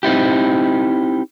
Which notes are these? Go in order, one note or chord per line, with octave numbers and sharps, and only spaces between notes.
C4 D#4 E4 G4